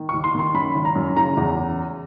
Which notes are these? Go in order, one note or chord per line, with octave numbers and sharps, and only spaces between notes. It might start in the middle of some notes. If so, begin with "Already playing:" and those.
Already playing: D#3
C#6
D#2
C6
D#3 C6
F#2 B5
G#1
A#5
F#2
C#3 A#5
E2